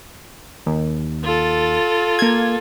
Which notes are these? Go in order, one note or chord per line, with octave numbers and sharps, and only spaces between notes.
D#2
F4 A4
A#3 G#6